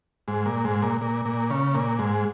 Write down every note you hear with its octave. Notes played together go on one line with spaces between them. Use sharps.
G#2
A#2
G#2
A#2
A#2
A#2
C#3
A#2
G#2